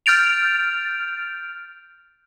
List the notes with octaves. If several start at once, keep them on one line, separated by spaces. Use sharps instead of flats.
F6 G6 A6 D7 F7